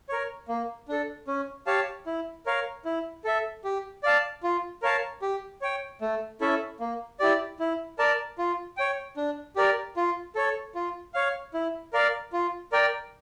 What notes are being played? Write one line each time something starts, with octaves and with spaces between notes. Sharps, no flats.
A#4 C#5
A#3
D4 A4
C#4
G4 C#5 F5 A5
E4
A#4 C#5 F5
E4
A4 E5
G4
D5 F5 A5
F4
A#4 C#5 F5 A5
G4
C#5 G5
A3
C#4 E4 A4 E5
A#3
E4 G4 D5
E4
A#4 D5 A5
F4
C#5 G5
D4
G4 A#4 D5
F4
A4 C#5
F4
C#5 F5
E4
A#4 D5 F5
F4
A#4 D5 G5